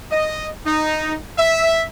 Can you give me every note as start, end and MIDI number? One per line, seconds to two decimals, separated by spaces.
0.11 0.47 75
0.65 1.13 63
1.37 1.83 76